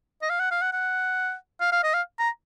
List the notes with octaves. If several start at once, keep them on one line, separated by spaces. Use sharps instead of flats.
D#5
F5
F#5
F5
F#5
F#5
F5
F5
D#5
F5
A#5